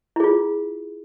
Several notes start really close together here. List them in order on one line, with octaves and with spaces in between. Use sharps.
E4 G#4 F4